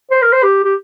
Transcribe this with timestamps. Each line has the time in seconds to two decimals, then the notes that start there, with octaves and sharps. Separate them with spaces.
0.11 C5
0.22 A#4
0.32 C5
0.43 G4
0.64 G4